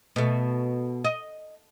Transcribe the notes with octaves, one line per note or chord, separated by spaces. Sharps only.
B2 A3
D#5